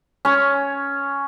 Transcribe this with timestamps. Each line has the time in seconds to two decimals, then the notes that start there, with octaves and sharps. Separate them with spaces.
0.25 C#4 C#5